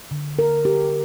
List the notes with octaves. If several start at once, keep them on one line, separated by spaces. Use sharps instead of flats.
D3
A#4
G4